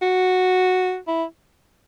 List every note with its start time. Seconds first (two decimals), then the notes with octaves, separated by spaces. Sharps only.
0.01 F#4
1.07 E4